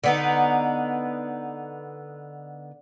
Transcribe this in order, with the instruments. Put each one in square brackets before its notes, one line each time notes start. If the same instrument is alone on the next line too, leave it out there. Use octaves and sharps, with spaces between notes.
[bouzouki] D3 B3 D#4